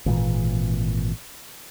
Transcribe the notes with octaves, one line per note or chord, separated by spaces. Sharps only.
G#1 A#2 D#3 E3